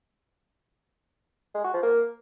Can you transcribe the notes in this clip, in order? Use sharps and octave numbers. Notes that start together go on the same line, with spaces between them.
G#3
F#4
F3
A#3